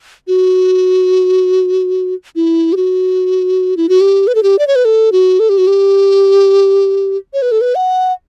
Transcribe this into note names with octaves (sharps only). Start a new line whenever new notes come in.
F#4
E4
G4
F#4
E4
F#4
G4
B4
A4
G4
D5
C#5
B4
A4
F#4
A4
G4
F#4
G4
C#5
B4
A4
B4
F#5